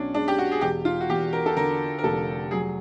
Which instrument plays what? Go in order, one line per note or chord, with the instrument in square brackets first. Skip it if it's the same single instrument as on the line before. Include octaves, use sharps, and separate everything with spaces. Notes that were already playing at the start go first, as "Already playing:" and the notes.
Already playing: [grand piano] B1 [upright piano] C#4 D4
[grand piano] G#3 [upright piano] D4
[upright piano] G4
F#4
G#4
[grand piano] E1 [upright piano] G4
[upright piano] F4
F#4
[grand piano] E2 [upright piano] G4
[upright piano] A#4
A4
[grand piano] D3 [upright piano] A#4
[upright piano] A#4
[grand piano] F1 [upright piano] A4
[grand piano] F#3 [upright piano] G#4